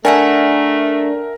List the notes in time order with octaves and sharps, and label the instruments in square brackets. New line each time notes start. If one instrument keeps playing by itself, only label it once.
[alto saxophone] A3 [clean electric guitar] D4 [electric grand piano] A#4 [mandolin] E5 F#5 G#5